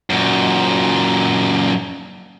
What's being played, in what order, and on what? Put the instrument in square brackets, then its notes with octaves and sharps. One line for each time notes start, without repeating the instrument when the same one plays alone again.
[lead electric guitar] F#2 A#2